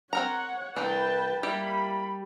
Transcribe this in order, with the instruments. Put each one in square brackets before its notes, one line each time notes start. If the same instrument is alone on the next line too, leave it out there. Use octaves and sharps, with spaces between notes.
[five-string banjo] C4 A#4 A#5 [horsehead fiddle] C#5 [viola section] F#5
[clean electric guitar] C2 [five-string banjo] E3 A3 D4 [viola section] B4 [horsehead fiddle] G5 A5
[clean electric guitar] G3 [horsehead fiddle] A#3 [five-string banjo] E4 G4 [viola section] B5